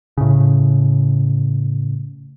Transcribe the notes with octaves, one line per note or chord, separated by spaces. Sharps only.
A2 C#3